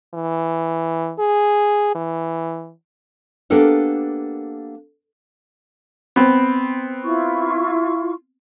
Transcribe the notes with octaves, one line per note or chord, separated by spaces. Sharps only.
E3
G#4
E3
A#3 B3 D4 G4 A4 A#4
B3 C4
E4 F4 C#6